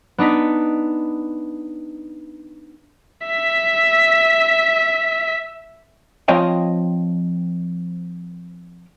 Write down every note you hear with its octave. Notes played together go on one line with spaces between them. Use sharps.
B3 D4 D#4 B6
E5 B6
F3 C4 C#5 D#5 F5 G5